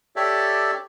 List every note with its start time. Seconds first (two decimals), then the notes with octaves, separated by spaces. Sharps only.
0.16 G4 A4 C#5 D5 E5